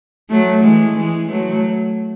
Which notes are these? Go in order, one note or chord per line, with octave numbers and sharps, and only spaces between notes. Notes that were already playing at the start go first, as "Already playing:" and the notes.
F#3 A3
E3 G#3
E3 G#3
F#3 A3